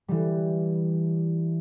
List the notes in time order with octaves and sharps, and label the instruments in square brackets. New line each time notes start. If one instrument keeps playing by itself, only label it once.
[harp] E3 G3